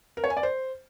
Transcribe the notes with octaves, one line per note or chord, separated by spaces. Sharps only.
A#4
C#5
G#5
D5
C5